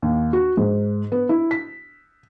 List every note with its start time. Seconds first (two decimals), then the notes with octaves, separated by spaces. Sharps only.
0.02 D#2
0.33 F#4
0.57 G#2
1.12 B3
1.29 E4
1.51 B6